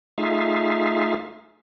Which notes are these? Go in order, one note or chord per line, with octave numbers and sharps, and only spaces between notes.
A3 D#4 F4 G#4 E5 F5